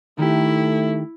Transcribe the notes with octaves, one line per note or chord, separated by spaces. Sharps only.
D#3 A3 E4 G4